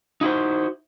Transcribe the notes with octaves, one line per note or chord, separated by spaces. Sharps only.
D#4 E4 F#4 C5